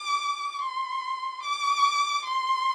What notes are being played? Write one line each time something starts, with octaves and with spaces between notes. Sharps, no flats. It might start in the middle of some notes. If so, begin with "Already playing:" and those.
Already playing: D6
C6
D6
C6